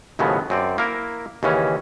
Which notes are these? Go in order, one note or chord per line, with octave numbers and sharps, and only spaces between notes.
D#2 A2 C#3 F3 F#3 B3
F#2 C4 D5
A#3 E4 A#4
D#2 C#3 E3 C#4